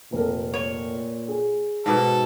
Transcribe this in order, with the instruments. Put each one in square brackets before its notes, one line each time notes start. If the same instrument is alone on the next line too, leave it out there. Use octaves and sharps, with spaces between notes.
[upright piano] F1 A4 A#4 [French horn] A#2
[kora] C#5
[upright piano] G#4
[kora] G#2 B2 [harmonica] A4